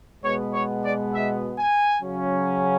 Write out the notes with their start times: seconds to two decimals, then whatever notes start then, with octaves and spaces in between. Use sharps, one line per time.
0.24 B2 G#3 B3 C#5
0.53 C#5
0.83 D5
1.13 E5
1.57 G#5
2.02 C#3 F#3 C#4